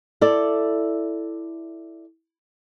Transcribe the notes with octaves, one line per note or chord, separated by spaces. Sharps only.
E4 A4 D5